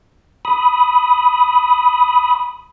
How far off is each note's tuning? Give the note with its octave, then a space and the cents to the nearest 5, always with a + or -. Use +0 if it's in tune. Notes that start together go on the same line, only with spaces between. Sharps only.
B5 +0 D#6 +5